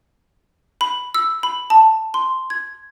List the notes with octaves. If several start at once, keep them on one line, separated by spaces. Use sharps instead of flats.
B5
E6
B5
A5
C6
G#6